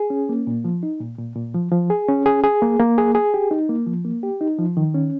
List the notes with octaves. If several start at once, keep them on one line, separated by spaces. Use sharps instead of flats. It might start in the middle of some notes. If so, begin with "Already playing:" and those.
Already playing: G#4
C#4
A#3
A#2
F3
D#4
A#2
A#2
A#2
F3
F3
G#4
C#4
G#4
G#4
A#3
A#3
G#4
G#4
G4
D#4
A#3
F3
A#3
G4
D#4
F3
D#3
C#4